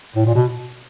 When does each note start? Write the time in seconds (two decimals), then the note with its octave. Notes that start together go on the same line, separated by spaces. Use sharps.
0.16 A2
0.26 A#2
0.35 B2